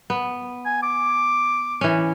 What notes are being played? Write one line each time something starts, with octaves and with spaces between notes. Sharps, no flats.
B3
G#5
D6
E3 C#4